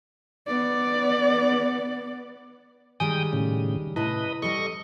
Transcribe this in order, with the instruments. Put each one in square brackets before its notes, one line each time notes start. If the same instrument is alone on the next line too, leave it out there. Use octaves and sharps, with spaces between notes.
[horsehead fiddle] B3 D5
[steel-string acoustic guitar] D#3 G3 G#3 [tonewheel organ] G5 D#6 [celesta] G#5
[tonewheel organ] A2 C#3
[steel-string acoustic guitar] A2 C3 A5 [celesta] E4 [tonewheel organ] B4 D#5
[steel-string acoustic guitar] G3 C4 A4 [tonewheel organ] D#5 C#6